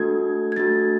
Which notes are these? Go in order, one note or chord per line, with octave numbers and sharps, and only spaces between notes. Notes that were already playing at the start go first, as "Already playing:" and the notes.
Already playing: A3 D4 F#4 A4 G#6
G#6
A3 D4 F#4 A4 A6